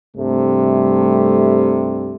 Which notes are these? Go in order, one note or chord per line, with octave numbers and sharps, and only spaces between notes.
C2 G2 C3 G3 A3